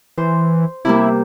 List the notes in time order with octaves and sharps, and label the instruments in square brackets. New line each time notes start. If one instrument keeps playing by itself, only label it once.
[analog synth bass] E3 [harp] C5
[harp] C3 G3 A#3 [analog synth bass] E4